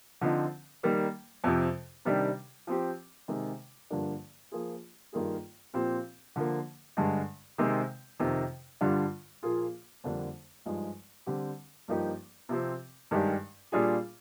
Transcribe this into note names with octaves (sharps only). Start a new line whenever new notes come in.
D3 F3 C4 D#4
D#3 G3 A#3
F2 C3 F3
C3 D#3 G3 D4 G4
F3 C4 G4
C3 D#3 G#3
G2 D3 F3 A#3 D4
F3 A#3 F4 G#4
G2 D#3 A#3 F4 G#4
A#2 F3 C4 G4
D3 F3 A#3
G2 D3 G#3
C3 D#3 G#3 C4
F2 C3 D#3
G2 D3 G3 D4 F4
A#2 F3 A#3 F4 G#4
F2 D3 G3 A#3 D4
G2 F3 G#3 D#4
D3 G3 C4 G4
G2 F3 A#3 D#4 G4
C3 F3 C4 G4
G2 D#3 G#3 D4 G4
A#2 G3 D4 F4 G#4